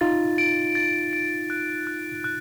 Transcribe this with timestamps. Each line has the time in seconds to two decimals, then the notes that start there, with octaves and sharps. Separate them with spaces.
0.01 D#4 F4 A6
0.38 D7
0.75 A6
1.13 D7
1.50 F#6
1.87 F#6
2.24 F#6